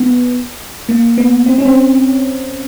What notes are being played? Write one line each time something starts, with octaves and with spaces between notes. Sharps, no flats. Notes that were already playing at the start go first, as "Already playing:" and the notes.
Already playing: B3
A#3
B3
C4
C#4
C4